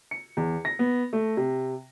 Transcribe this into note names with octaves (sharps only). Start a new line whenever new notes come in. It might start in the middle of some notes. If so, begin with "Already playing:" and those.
C#7
E2
A#6
B3
A3
C3